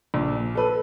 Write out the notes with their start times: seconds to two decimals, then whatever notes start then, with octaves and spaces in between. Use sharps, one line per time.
0.14 A#1
0.55 A4 B4